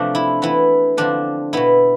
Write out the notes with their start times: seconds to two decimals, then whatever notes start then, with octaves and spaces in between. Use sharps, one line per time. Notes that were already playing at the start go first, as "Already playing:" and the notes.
Already playing: C3 F3 A3 C4 D4
0.15 E4
0.42 E3 B3 E4
0.97 D3 F3 C4 D4
1.53 B2 B3 E4